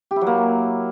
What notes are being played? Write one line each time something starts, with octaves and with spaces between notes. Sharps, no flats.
G4
E4
F#3
A#3